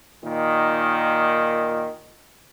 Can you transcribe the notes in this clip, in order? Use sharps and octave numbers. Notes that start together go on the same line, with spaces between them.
A#2 D#3